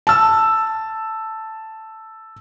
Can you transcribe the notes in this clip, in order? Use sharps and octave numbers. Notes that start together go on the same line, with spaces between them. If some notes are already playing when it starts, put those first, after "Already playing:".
A5 E6